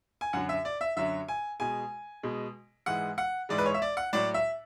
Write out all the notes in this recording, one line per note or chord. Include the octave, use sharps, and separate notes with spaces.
G#5
F#2 D3 F#3 F#5
E5
D5
E5
F#2 D3 F#3 E5
G#5
B2 G#3 G#5
B2 G#3
G#2 E3 G#3 F#5
F#5
G#2 E3 G#3 D5
B4
C#5
E5
D5
F#5
A2 F#3 D5
E5